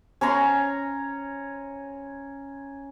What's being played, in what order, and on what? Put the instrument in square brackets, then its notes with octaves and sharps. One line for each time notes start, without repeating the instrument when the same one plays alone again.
[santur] C#4 C#5 A#5 C6